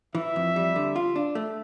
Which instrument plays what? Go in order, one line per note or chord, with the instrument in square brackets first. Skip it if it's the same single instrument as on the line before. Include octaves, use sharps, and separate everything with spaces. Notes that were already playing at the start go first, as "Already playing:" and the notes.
[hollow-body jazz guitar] E3 [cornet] E5
[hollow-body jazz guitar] F2
G3
D3
F4
D4
A3